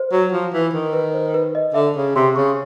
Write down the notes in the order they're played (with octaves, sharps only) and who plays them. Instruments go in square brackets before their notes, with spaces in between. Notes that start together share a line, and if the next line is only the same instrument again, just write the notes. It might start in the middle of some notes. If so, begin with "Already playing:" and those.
Already playing: [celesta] C5
[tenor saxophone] F#3
F3
E3
D#3
[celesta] B4
C5
B4
D#5
[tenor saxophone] D3 [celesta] E5
[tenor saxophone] C#3
[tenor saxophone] C3 [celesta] C6
[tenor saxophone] C#3 [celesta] C#6